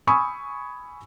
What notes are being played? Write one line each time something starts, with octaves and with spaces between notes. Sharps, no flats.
G#5 B5 C#6 D#6 E6